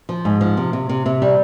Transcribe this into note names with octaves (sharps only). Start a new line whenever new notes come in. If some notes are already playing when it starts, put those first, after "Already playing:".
F3
G#2
F3
C3
C3
C3
C3
G3